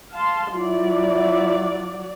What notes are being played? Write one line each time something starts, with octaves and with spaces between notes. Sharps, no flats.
F5 A5 C6
F#3 E4 F4 D5